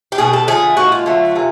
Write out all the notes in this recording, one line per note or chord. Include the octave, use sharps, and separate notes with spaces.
G4
B2 G3 G#4
A4
D3 F3 A3 G#4
A#2 F3 G#3 F#4
F4
D3 F#3 A3
C3 E3